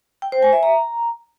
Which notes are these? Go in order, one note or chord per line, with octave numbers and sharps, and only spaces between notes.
G5
C5
G#5
E5
A#5